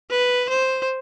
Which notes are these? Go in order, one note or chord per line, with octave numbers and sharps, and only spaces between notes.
B4
C5